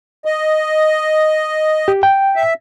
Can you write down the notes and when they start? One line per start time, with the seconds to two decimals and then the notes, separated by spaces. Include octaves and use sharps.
0.25 D#5
1.88 G4
2.03 G5
2.36 E5